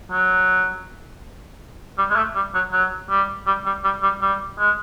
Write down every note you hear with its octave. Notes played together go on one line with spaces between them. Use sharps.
F#3
G3
G#3
A3
G3
F#3
F#3
G3
G3
G3
G3
G3
G3
G#3